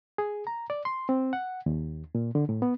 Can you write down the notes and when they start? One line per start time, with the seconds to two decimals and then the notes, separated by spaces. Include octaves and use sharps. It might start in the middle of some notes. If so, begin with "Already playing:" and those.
0.18 G#4
0.47 A#5
0.70 D5
0.85 C6
1.09 C4
1.33 F#5
1.66 D#2
2.15 A#2
2.35 D3
2.49 A2
2.62 B3